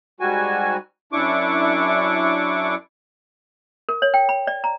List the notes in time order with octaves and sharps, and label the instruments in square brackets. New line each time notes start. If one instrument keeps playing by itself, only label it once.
[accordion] G#2 G3 F#4 G#5
F#2 D4 E4 C#6 D6
[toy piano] A#4
C#5
G5
B5
D5
A#5